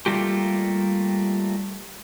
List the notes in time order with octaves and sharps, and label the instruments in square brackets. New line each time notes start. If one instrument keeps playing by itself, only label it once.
[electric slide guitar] G3 A3 A#3 F4 G4